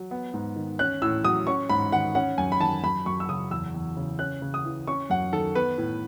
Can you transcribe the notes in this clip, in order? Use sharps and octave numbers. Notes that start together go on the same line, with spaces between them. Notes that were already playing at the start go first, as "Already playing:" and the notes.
Already playing: F#3
B3
G#2
D#3
C#4 F#6
A2 E6
F#3 D#6
C#4 C#6
G#2 B5
D#3 F#5
C#4 F#5
F#2 G#5
B5
D#3 A5
F#2 B5
F#2 C#6
E6
C#3 D#6
E2 E6
E2
C#3
C#4 F#6
C#3
D#6
E3
C#4 C#6
F#2 F#5
D#3 A4
B3 B4
A2